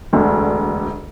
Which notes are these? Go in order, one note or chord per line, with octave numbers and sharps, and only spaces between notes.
E1 D2 D3 A3 D4